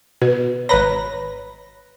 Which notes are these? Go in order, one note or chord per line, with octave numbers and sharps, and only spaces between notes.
B2 B4
G#1 B4 C#5 A#5 B5 A#6